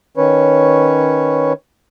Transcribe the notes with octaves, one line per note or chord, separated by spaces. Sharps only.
D#3 C#4 B4 C#5